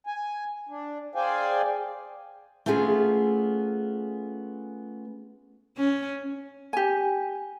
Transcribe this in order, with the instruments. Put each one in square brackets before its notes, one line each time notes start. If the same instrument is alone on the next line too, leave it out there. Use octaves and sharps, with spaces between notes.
[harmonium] G#5
D4
G#4 C5 D5 F5 G5 G#5
[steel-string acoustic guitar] A3 B3 C#4 F4 G#4
[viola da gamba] C#4
[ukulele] G4 G#5